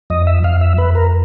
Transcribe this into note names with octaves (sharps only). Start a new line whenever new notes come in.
F2 D#5
E5
F2 F5
E5
F2 B4
A#4